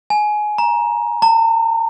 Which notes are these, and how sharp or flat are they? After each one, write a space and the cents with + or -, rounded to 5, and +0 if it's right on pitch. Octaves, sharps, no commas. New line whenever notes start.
G#5 +20
A#5 +15
A#5 -45